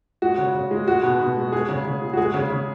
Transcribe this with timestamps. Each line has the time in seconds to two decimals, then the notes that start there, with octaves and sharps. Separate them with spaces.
0.22 G#3 F#4
0.38 C#3
0.54 C#3
0.71 G#3
0.87 G#3 F#4
1.03 B2
1.20 B2
1.36 G#3
1.52 G#3 G#4
1.69 C#3
1.85 C#3
2.02 G#3
2.13 F#4
2.17 G#3 G#4
2.34 C#3
2.50 C#3